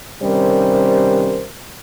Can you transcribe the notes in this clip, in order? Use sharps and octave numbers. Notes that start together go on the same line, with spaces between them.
C3 D#3 G3 C#4 A#4 C5